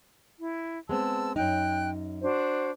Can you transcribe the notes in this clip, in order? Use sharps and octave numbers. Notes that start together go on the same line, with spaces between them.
E4
G#3 B3 C4 A5 E6
F#2 D#4 G5 F#6
D4 F#4 C5